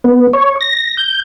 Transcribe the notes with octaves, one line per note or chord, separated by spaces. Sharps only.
B3
C#5
A#6
G6